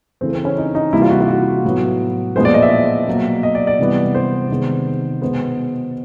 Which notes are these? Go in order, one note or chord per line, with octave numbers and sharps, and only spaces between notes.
C#3 E3 A3 C4
C4
C#4
D#4
D#4
C3 E3 G3 A#3 E4
F4
F#4
F4
F#4
A2 F#3 B3
A#2 F3 G#3 B3 C5
D5
D#5
E5
B2 F#3 A#3
D#5
D5
D5
C3 E3 G3 B3
C5
C3 D#3 G#3 B3
B2 G#3 B3 C5